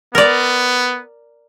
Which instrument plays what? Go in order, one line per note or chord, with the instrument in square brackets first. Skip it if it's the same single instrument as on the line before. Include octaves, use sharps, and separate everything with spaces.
[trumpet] B3 [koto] A#4 D5